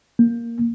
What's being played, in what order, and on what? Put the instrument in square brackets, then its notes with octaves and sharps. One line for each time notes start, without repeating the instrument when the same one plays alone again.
[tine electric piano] A#3